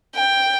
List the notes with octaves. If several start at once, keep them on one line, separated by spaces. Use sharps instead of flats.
G5